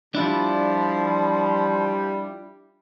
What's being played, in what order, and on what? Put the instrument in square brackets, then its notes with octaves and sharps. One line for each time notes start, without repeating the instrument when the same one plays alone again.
[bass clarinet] F3 [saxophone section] G3 [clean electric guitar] D4 E4 F4